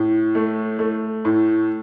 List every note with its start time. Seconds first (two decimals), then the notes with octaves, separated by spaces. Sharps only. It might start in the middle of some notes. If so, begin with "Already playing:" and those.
Already playing: A2
0.35 A3
0.79 A3
1.25 A2